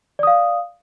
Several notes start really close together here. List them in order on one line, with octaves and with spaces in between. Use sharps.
D5 D#6 F5